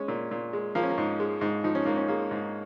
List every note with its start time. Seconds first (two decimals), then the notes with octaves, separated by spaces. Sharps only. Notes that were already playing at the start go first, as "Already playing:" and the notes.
Already playing: G#3 C#4
0.08 A#2
0.31 A#2
0.53 G#3
0.75 F3 A#3
0.83 C#4
0.90 A#3
0.98 G#2
1.20 G#3
1.41 G#2
1.64 F3 D#4
1.75 C#4
1.85 G#2 A#3
1.97 C#4
2.08 G#3 A#3
2.31 G#2